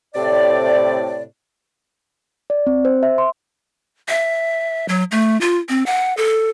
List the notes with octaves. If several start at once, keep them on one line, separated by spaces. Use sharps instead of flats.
A2 C3 D5
D5
C4
C5
E5
C6
E5
F#3
A3
F4
C4
F#5
A4